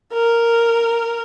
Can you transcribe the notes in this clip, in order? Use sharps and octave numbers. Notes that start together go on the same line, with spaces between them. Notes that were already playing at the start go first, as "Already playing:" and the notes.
A#4